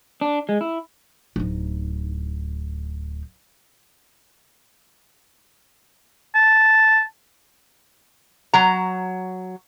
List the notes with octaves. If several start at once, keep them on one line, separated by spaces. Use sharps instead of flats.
D4
G#3
E4
D1 D#4
A5
F#3 A#5